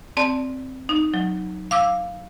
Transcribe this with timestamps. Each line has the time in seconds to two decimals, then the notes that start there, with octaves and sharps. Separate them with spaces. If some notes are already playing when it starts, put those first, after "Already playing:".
0.17 C4 D5 A5
0.89 D#4
1.14 F#3
1.71 F5 D6 E6